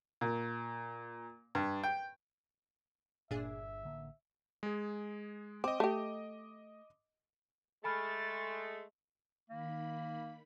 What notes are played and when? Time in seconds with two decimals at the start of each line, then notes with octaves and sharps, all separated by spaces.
0.21 A#2
1.55 G2
1.84 G5
3.31 G1 A#2 D4 G#4 E5
3.83 A1 D3 A#3
4.63 G#3 G#4
5.64 C4 D#5 D6
5.80 A3 G4
7.84 G#3 A3 G#5 B5 F6 A6
9.50 D#3 A#3 B5